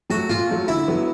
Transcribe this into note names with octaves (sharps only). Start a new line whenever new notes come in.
F#3 A3 F#4
A#2 F4
F#3 A3
D3 E4
F#3 B3